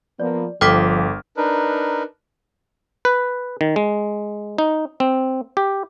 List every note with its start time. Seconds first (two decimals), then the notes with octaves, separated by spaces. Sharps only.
0.20 F3 A#3 B3 D5
0.61 G1 F3 A4 G5 D6 F6 B6
1.37 D4 D#4 A#4 B4
3.05 B4
3.61 D#3
3.76 G#3
4.58 D#4
5.00 C4
5.57 G4